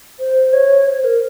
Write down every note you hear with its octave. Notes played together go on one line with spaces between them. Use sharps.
C5
C#5
C5
A#4